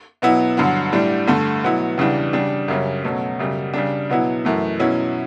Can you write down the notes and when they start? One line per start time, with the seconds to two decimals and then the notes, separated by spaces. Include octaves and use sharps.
0.22 B2 F#3 B3 E4
0.57 G2 D3 F#3
0.92 A2 G3 D4
1.27 G2 D3 A3
1.63 B2 F#3 B3 E4
1.98 E2 C#3 E3 G3 D4
2.33 C#3 G3 D4
2.68 F#2 C#3 G3 C#4
3.04 B2 F#3 A3 C#4
3.39 F#2 C#3 G3
3.74 C#3 G3 D4
4.09 B2 F#3 B3 E4
4.45 F#2 E3 A3
4.79 B2 F#3 C#4 E4